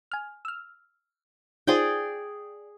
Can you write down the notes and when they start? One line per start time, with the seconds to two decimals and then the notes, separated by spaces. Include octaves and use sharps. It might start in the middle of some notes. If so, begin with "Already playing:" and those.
0.11 G#5 F6
0.45 E6 F6
1.67 D#4 F4 G#4 C5 D5 G5